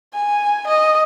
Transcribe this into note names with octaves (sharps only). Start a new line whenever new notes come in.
G#5
D#5